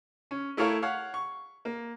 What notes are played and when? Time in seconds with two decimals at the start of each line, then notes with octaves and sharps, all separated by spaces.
0.31 C#4
0.57 A3 E4 A4 A#4 C#5 F5
0.82 C#5 F5 F#5
1.14 C#6
1.65 A#3